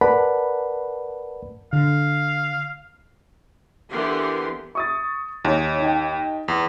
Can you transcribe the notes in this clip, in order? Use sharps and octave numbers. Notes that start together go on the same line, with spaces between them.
A#4 B4 D5 F#5 A5 B5
D3 F5
D3 E3 B3 G4 A#4 C6
C#6 D#6 A6
D#2 D#4 C#5
D#4 G5
E2